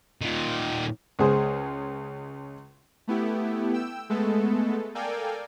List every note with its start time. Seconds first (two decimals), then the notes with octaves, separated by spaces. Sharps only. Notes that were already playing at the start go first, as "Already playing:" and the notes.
0.21 A#2 D#3
1.19 C#2 G#3 G#4 C5
3.07 A3 B3 E4 G4
3.73 G5 E6
4.09 G#3 A3 B3 A4
4.95 A4 A#4 D5 F5 G5 G#5